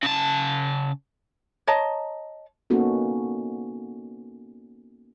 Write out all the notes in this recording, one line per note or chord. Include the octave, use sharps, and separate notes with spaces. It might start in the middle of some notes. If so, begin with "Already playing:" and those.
C#3 A5
C#5 D#5 A5 A#5
A#3 B3 C#4 D#4 F#4 A4